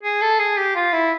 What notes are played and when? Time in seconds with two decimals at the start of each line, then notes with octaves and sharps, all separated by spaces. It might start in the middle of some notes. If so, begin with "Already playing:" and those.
0.03 G#4
0.22 A4
0.39 G#4
0.57 G4
0.75 F4
0.93 E4